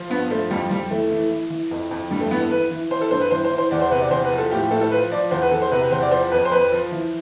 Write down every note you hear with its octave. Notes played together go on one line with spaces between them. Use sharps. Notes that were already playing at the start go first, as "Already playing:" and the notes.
Already playing: F3
G2 B3
F3 A3
F2 G3
F2 G3
E3 A3
E3
E3
E3
F2
F2
G2 G3
A3
E3 B3
A4
E3 B4
E3
E3 C5
A4
G2 C5
B4
E3 C5
C5
E3
C5
E2 D5
C5
C3 B4
D5
E2 C5
B4
F3
A4
A2 G4
A2 A4
A4
F3 B4
F3 D5
E2 C5
B4
E2 A4
C5
C3 B4
B4
E2 C5
D5
F3 C5
F2 B4
C5
F2 B4
F3
E3